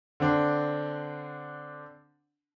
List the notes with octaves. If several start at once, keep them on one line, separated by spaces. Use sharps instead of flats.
D3 C4 D4